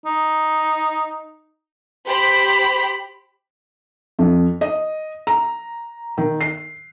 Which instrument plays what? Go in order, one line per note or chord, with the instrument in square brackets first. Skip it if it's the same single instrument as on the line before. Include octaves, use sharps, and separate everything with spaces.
[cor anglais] D#4
[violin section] G4 C5 B5
[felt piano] F2
D#5
A#5
D#3
C7